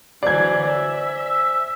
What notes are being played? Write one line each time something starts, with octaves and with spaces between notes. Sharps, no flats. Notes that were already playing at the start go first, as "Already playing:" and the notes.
D3 E3 F#3 C5 D5 G#5 G#6
E5
E6